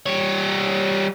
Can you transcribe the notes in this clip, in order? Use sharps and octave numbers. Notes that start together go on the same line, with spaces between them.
G3 C#5